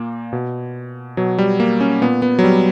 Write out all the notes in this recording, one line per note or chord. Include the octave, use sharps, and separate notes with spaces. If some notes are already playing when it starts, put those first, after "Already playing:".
Already playing: A#2 A#3
B2
B2 F#3
G3
A#3
C#4
A#2 B3
B3
F#3
G3